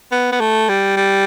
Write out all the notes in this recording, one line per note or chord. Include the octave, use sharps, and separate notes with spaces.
B3
B3
A3
G3
G3